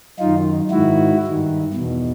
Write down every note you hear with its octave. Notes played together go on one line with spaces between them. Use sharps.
F#2 D#3 D#4 F4
G#2 D#3 E4 F#4
G2 D#3
E2 B2